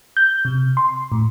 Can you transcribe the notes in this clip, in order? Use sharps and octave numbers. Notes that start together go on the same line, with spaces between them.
G6
C3
C6
A2